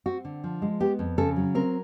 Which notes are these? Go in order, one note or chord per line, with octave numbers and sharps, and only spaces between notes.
C4 F#4
D3
F3
G#3
B3 G4
F2
C#3 A4
F#3
C4 A#4